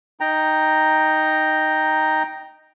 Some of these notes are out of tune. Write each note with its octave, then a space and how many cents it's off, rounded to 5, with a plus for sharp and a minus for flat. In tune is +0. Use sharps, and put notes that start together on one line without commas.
D#4 +0 G5 +0 A#5 +0